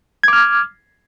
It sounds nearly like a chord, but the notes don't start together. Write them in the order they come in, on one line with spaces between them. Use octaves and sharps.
G#6 D6 F6